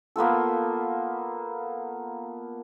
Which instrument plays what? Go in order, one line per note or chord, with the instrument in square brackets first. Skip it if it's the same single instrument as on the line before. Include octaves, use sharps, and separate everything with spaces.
[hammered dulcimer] A#3 B3 F4 A4